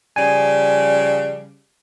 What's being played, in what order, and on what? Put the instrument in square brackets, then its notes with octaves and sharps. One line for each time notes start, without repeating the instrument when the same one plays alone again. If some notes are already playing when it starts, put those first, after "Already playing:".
[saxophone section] C#3 F3 G3 [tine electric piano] G#5